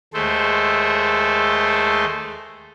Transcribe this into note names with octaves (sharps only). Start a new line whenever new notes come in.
D#2 G#3 A3 A4 C5